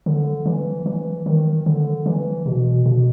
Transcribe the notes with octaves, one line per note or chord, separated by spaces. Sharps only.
D3
E3
E3
D#3
D3
E3
B2
B2